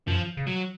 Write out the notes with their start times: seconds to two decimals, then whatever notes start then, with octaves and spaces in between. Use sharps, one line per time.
0.08 F#2 F3
0.37 C#3
0.47 F#3